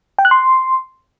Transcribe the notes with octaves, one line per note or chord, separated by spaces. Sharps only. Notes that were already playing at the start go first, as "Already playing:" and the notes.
G5
F#6
C6